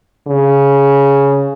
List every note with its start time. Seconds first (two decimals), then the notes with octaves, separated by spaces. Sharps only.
0.27 C#3